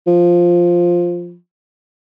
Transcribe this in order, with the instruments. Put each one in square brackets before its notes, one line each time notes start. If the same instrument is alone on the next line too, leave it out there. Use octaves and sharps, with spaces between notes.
[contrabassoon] F3